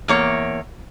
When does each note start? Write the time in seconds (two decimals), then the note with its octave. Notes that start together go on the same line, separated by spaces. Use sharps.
0.08 E2 A#3 C#5